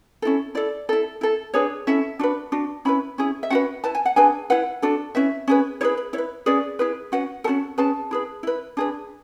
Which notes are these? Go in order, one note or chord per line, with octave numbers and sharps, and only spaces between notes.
C#4 E4 A4
E4 A4 D5
E4 A4
E4 A4
D4 G#4 B4 C#5
C#4 E4 A4 E5
D4 F#4 B4
D4 F#4
C#4 E4 B4 B5
C#4 E4 G#4
E5
C#4 F#4 B4 F#5
E4 B4 A5
G#5
F#5
D4 G#4 B4 G#5
E4 B4 F#5
D4 F#4 A4
C#4 E4 B4 E5
C#4 G#4 B4
E4 G#4 B4 C#5
B4
E4 C#5
B4
C#4 G#4 B4 D5
E4 G#4 B4
C#4 F#4 B4 F#5
C#4 F#4 A4 A5
C#4 G#4 B4 A5
E4 G#4 B4
E4 B4
D4 G#4 B4